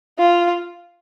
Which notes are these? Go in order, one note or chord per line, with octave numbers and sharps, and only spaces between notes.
F4